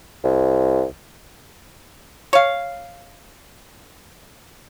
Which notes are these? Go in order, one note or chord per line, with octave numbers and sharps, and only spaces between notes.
C2
C#5 F5